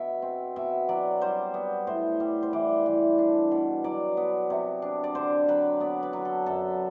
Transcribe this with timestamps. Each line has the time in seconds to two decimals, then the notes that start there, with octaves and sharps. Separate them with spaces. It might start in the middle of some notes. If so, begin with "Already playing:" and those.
Already playing: B2 E5
0.22 C4
0.56 B2 E5
0.89 F#3 D5
1.21 G3 C5
1.54 B3
1.87 A2 C5
2.20 G3
2.43 C5
2.53 E3 D5
2.86 E3
3.18 D4
3.51 B2
3.84 F#3 D5
4.17 B3
4.50 C3
4.82 D4
5.04 D5
5.15 D3 C5
5.48 F#3 B4
5.80 B3 D5
6.03 B4
6.13 F#3
6.25 A4
6.46 F#2 A4